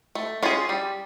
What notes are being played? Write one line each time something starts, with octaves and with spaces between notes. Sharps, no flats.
A3
C#4 F4 G#4
G3